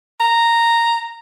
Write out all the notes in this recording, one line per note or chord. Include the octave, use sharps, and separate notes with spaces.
A#5